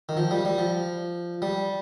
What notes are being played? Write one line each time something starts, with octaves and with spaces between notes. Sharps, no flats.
D#3
F3
G3
G3
F3
G3